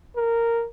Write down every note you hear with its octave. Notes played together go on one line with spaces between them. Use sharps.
A#4